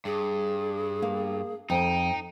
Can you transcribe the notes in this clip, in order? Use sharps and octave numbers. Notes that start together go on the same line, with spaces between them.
G2 G#4
A#3
F2 D#4 G5